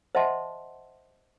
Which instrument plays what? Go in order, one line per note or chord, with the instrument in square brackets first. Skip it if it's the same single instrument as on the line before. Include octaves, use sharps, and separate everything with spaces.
[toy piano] C5 D#5 E5 F#5 A5 C6